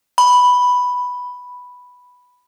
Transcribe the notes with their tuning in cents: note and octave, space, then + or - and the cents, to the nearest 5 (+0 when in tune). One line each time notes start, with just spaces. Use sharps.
B5 +0